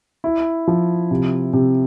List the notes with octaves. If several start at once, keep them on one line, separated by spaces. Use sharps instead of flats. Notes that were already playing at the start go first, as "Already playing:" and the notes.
E4
F3
C3
C3